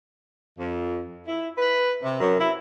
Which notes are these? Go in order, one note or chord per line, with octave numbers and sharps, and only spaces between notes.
F2
E4
B4
C3
F#2
E4